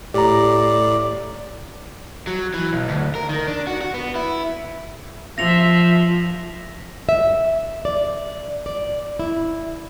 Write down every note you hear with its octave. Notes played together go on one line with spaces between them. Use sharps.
A2 G4 D5 A#5
F#3
E3
B1
D2
A#4
D#3
D4
F#4
F#4
B3
E4
F3 F4 E5 A#6 F7
E5
D5
D5
E4